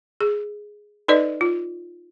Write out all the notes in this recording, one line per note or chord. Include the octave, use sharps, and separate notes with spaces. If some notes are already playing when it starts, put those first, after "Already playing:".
G#4
D#4 A4 B4 D5 D#5
F4